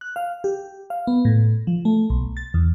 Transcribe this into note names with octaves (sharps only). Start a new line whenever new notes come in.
F#6
F5
G4
F5
B3
A2
F3
A3
B1
A6
E2